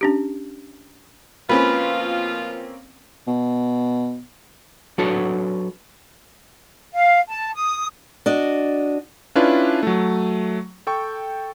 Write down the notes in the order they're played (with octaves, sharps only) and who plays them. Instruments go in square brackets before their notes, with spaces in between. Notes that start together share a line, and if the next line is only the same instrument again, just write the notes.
[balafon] C#4 D4 G4
[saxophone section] B2 F3 F4 [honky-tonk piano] A#3 C4 C#4 [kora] B4
[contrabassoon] B2
[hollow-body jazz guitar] F#3 D4 F#4 A4 B4 C#5
[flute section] F5
A5
D#6
[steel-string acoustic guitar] D4 F#4 D#5
[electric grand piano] C#4 D4 E4 F4 B4
F#3 A3
A4 G5 C#6